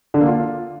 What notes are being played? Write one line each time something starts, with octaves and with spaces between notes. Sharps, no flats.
D3
A#3
F4